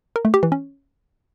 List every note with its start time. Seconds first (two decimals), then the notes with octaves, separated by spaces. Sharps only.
0.16 A#4
0.25 A3
0.34 G4
0.43 E3
0.52 C#4